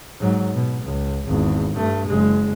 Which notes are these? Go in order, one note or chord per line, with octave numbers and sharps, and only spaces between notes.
G#2 F#3
B2
C#2
G#1 E2
G2 A3
F#1 G#3